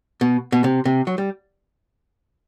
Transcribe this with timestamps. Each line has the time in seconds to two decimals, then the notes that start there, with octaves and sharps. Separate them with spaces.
0.21 B2
0.52 B2
0.64 C3
0.85 C3
1.07 F#3
1.18 G3